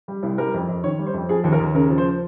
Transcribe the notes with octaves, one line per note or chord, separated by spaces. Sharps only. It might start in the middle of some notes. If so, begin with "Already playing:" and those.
G3
C2
G3 A#4
F2
F2
D#3 C#5
G3
C5
F2
F3 G#4
D#2
A#4
D#2
C#3 A#4
F3
C5